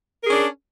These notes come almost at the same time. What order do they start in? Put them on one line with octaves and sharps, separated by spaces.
A#4 G#4 C#4 D4